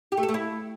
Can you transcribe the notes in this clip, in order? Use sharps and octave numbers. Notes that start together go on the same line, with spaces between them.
G4
A3
A4
A3
E4